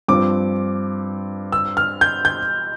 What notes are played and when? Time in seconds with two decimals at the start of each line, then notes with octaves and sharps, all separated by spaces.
0.08 G2 F3 C4 D6
1.52 E6
1.77 F6
2.01 G6
2.25 G6